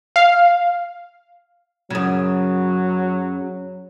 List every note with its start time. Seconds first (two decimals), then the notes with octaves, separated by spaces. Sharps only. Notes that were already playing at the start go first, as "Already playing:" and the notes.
0.16 F5
1.90 F#2 C#3 F#3